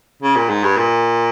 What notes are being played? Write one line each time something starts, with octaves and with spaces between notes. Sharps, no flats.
C#3
A#2
G#2
G2
A#2